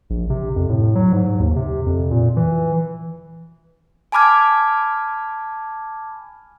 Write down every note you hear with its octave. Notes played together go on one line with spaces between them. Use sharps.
A#1
C3
F2
A2
F#3
G#2
D#2
C3
F2
A#2
E3
G#5 A5 B5 D6 F6 G#6